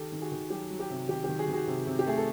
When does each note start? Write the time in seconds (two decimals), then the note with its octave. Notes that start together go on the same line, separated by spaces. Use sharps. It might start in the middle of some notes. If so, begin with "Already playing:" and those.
Already playing: D#3 G4 A4
0.12 D#3
0.21 F#4 G#4
0.32 D#3
0.50 F#3 G4
0.71 F#3
0.80 G4
0.90 C3
1.09 D#3 G4
1.24 D#3 G4
1.39 F#4 G#4
1.48 D#3
1.53 F#4 G#4
1.67 C3
1.87 C3
1.99 G4
2.06 A3 G#4
2.17 A4